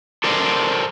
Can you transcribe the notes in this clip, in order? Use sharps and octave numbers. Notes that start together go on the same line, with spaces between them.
A4 A#4 C5 D5